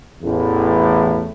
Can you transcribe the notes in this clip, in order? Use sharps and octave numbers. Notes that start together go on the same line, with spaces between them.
A1 E2 A2